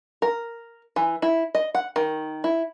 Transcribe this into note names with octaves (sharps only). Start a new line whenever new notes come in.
A#4
E3
E4
D#5
F#5
D#3
E4